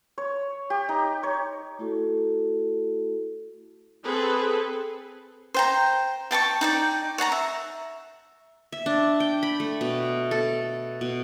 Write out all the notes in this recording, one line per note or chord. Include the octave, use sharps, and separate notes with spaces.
C#5
G4
D#4
C#5
A3 E4 F#4 A4
C4 G#4 A4 B4
C5 G5 A#5
G5 A5 B5 C#6
D#4 D5 G5
C#5 F#5 A5 A#5
E5
E5
D4
G5
B5
A3
B2
A4
B2